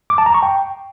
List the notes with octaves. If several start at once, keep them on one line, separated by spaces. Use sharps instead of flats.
D6
A5
A#5
C#6
G5